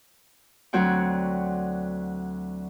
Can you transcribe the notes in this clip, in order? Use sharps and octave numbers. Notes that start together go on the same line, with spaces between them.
D2 F#3 C4 F#4 C#5 G5